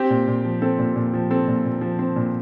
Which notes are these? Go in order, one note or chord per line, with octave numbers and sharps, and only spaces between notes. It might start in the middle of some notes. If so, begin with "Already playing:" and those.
Already playing: C4 G4
A#2
A#2
F3
C4 A4
A#2
A#2
F3
C4 A4
A#2
A#2
F3
C4
A#2